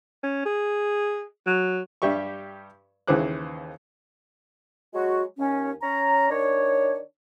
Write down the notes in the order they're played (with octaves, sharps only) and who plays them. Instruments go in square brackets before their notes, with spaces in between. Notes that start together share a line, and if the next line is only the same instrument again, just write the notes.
[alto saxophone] C#4
G#4
F#3
[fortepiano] G2 G3 G4 E5 C#6
D#2 C#3 E3 C5 D6 F#6
[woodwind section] F#3 G#3 F#4
D#2 C#4
C#4 A#5
D#3 D4 C#5